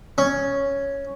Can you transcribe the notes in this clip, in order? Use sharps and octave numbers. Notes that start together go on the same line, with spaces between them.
C#4